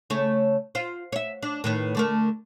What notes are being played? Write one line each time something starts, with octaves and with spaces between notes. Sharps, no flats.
C#3 A3 C#5
F4 C5
C#5 E5
D4
A2 D#3 B4
D3 A3 A#4